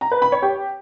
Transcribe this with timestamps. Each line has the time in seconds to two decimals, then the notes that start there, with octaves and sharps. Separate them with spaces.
0.01 A#5
0.11 B4
0.22 B5
0.32 C#5
0.42 G4